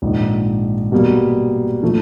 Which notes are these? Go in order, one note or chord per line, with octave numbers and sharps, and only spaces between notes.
A#1 G#2 D#3
B2 G3 A#3
A#2 F3 A3